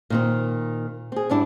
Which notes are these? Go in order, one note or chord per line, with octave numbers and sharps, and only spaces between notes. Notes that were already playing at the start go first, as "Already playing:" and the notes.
A#2 D#3 C4
C4 G#4
G#2 G3 D4 E4